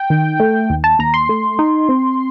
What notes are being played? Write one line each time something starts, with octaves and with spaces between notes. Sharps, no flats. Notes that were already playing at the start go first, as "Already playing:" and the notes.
Already playing: G5
D#3
A3
D#2
A5
D#2 A#5
C6
A3
D#4
C4